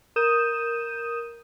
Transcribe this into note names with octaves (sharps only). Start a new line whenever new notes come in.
A#4 D#6 G6 D#7 E7